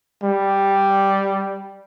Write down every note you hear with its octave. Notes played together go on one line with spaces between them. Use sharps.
G3